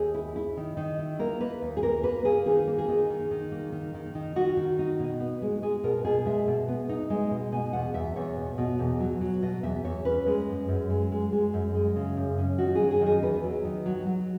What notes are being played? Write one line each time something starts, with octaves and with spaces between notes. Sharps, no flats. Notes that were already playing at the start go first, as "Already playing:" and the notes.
Already playing: D#2 G#4
E4
E4
D#3
D#3
E4
A#3 A#4
A#3 B4
D#2
G#4
A#3 A#4
A#3 B4
A#3 G#4
D#3 G#4
A#3
G#4
D#3
D#3
D#3
A#3
D#3
D#3
D#3
D#3 F#4
D#3
D#4
B2
B3
G#3
G#3 G#4
B2 A#4
B2 G#4
G#3 E5
B2
B3
D#4
G#3
B2
B2 G#5
E2 F#5
E2 E5
E2 C#5
B2
B2
E2
F#3
F#3
B2 D#5
E2 E5
E2 C#5
C#4 B4
G#3
F#2
F#2
G#3
G#3
G#3
F#2
G#3
C#3
F#2
C#4
D#3 F#4
F#3 G#4
G#4
D#3
G#4
E2 B4
F#3
D#3
F#3
F#3